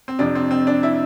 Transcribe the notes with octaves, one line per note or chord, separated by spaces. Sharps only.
C4
F2 C3 F3 D4
C4
C4
D4
E4